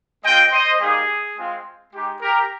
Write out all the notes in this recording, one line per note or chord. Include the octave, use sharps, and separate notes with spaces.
G#3 C4 F4 D#5 G5
C5 D#5
G3 A#3 D#4 G4 G#4
G#3 C4 F4
G#3 D#4 G4
G4 A#4